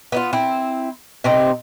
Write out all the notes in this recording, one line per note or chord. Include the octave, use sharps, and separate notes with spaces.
B3 D#4 F4
C4 E4
C3 C4 D#4